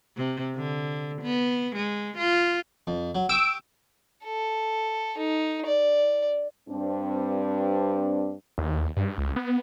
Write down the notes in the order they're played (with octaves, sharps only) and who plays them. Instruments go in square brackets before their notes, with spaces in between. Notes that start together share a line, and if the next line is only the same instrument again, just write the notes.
[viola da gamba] C3
D3
B3
G#3
F4
[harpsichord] F2
F#3
[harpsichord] G4 C#6 D#6 [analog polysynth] E6 D7
[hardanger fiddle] A4
D#4
D5
[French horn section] G2 C4 D4
[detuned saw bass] D#2
G2
C#2
B3